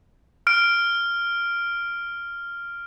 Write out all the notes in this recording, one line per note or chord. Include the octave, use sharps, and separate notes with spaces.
F6 D7